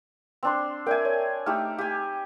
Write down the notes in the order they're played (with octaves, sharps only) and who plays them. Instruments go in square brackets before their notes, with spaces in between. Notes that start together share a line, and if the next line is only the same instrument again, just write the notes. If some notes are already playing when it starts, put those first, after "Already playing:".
[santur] C4 D4 C6
[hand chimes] A#4 D5 E5 [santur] G5 G#5
[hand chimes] C#5
[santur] A3 D#4 G4 [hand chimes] F6
[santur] G4 G#5